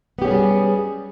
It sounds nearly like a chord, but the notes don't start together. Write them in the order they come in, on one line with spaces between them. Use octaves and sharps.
B3 G4 C#4 G#4 G3